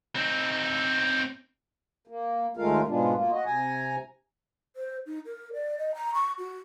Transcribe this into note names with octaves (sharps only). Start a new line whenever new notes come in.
C4 D#4
A#3
D#2 G#3 A3 F4 A#4 F5
G#2 B2 G#3 B3 D4 F4
A#3 F4
F#4 D#5
C3 G#5 A#5
C5
D#4
A#4
D5
D#5
A#5
C#6
F#4